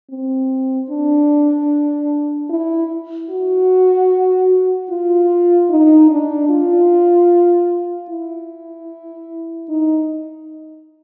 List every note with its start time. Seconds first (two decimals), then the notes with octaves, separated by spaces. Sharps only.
0.10 C4
0.90 D4
2.49 E4
3.30 F#4
4.90 F4
5.70 D#4
6.10 D4
6.49 F4
8.10 E4
9.69 D#4